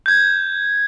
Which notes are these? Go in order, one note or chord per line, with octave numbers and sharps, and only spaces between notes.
G6 G#6